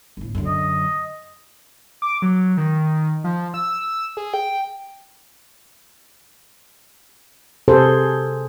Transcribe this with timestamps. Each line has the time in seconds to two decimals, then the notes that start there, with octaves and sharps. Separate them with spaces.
0.17 G1 A2
0.35 F#2 D3
0.47 D#5
2.02 D6
2.22 F#3
2.57 D#3
3.24 F3
3.54 E6
4.17 G#4
4.34 G5
7.68 C3 G#4 A4 C5